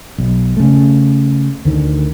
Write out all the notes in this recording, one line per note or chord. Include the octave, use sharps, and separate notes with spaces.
B1
C#3 A3
D2 D3 D#3